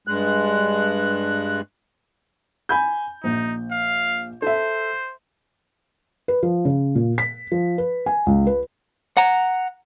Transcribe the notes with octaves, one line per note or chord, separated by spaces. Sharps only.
G2 G#3 F#6
G#5 B5 G6
A#1 D#4
F5
A4 C5 E5
B4
F3
C#3
A#2
B6
F3
B4
G#5
C#2
B4
F#5 A#5